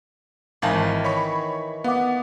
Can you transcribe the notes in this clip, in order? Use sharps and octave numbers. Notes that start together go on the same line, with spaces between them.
G#1 D#3 E3 F5 A5
C#5 B5 C#6
B3 F5 F#5 D6